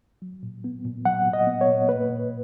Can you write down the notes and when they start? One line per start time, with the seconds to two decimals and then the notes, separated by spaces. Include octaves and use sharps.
0.22 F#3
0.43 A#2
0.64 B3
0.85 A#2
1.05 F#3 F#5
1.26 A#2
1.33 D#5
1.47 B3
1.61 C#5
1.68 A#2
1.88 A#3 B4
2.10 A#2